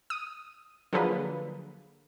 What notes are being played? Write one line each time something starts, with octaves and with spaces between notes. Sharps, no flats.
D#6
D3 F3 F#3 A#3 G#4 B4